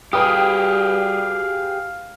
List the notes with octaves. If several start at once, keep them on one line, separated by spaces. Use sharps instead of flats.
G3 G4 G#4 B4 F5 G5 D#6